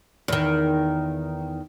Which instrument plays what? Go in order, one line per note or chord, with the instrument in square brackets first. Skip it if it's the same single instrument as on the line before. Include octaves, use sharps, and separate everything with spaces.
[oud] E2 D#3